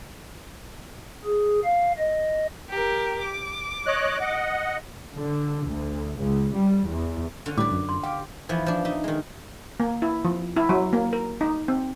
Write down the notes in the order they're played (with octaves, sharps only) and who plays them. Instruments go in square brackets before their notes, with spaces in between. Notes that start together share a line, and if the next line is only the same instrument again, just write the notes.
[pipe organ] G#4
F5
D#5
[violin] G4 A#4
D6
[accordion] C#5 D#5 F#6
D#5 F#5
[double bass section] D3
D2
C#2
G3
E2
[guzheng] D3 C#4 F4
[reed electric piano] A2 G3 [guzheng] B4 D5 [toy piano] D6
[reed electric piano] F#2
[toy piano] C6
[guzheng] G4 [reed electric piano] F5 D6 [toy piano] G5
[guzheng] E3 F3 B3
F3 D4
D#4 E5
D#3 G#3
[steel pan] A#3
E4
F3
E4
F#3
A#3
A#4
D#4
C4